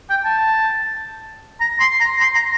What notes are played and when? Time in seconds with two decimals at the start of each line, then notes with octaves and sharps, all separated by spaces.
0.10 G5
0.25 A5
1.60 A#5
1.80 C6
2.00 A#5
2.20 C6
2.35 A#5